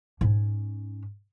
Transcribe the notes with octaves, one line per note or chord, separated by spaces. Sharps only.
G#2 C#4